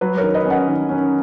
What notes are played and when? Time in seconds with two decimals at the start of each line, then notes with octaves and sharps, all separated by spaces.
0.01 F#3 B4
0.17 A#4 C#5
0.23 D#3
0.34 B4 D#5
0.45 C#4
0.50 D#5 F#5
0.67 D#3
0.89 C#4